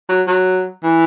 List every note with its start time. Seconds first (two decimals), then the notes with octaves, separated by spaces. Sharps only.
0.09 F#3
0.27 F#3
0.84 E3